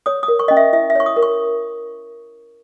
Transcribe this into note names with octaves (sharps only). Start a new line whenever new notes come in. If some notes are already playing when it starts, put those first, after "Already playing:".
C#5 D#6
D#6
A#4
C#6
C#4 D#5
E5
E4 E5
E5
C#5 C#6
D#6
A#4
C#6